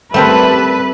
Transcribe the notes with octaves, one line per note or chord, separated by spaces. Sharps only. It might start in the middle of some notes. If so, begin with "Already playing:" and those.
G3 A3 C4 A#4 B4 E5 A5